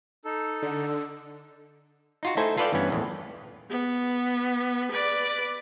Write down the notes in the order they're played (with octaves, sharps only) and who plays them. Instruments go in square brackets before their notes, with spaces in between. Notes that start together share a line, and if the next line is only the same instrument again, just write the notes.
[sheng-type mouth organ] D#4 A4
[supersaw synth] D3
[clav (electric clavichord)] D#4 F4 F#4
A3 D#4 E4 A4 C5 G#5
F4 A4 B4 D5 F5 G5
G2 E3 B3 C#4
A#1 E2 A2
[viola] B3
B4 D5